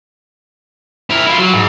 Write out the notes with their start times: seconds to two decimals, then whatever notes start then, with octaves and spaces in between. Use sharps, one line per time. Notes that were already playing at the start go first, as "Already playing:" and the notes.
1.10 E4 A#4
1.27 E4 F4
1.38 F#3
1.53 G#2